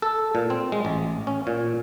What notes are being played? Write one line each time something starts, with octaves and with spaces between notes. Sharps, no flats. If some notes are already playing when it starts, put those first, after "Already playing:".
A4
A#2
C4
G#3
A1
C#4
A#2